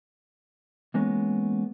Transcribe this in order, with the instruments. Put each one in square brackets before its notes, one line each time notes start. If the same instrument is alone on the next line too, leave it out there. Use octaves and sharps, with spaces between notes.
[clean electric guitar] E3 G#3 A#3 B3 C#4